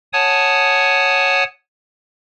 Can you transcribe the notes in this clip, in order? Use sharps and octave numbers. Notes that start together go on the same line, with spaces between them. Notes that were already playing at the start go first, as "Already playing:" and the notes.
C#5 F#5 G#5 A5 D#6